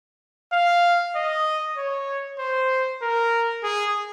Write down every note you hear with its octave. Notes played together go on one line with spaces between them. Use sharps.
F5
D#5
C#5
C5
A#4
G#4